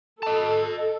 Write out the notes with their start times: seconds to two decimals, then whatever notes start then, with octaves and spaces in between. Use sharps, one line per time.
0.23 A4 D#5 A5